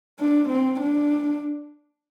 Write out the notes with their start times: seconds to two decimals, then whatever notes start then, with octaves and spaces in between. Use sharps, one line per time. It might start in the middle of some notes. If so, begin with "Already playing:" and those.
0.20 D4
0.50 C4
0.81 D4